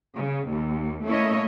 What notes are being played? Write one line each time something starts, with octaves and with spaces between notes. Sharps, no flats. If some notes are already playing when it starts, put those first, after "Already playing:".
C#3
D#2
A3 A#3 C#4 E4 C#5 D#5